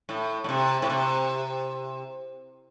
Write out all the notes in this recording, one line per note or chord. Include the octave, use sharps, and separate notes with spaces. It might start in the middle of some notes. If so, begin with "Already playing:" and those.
A2
A2
C3
A2
C3